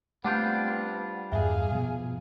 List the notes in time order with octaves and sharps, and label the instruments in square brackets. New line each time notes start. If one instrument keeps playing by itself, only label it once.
[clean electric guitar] G3 D4 F4 [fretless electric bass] A3 [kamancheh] B3 C4 [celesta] F#5 G6
[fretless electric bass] E2 G2 [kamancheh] G#4 F5 [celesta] E5
[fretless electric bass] B2 F3